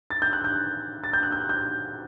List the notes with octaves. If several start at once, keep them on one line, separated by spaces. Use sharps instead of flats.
A6
G6
F#6
G6
A6
G6
F#6
G6
G6